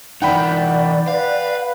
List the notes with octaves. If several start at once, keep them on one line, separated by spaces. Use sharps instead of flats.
E3 D#4 D5 F#5 G5 B5
B4 F5